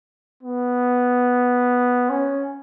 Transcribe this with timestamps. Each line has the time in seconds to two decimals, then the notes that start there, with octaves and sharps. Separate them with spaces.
0.43 B3
2.09 C#4